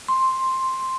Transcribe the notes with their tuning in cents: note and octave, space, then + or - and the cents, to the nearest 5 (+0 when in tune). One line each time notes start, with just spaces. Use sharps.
C6 +5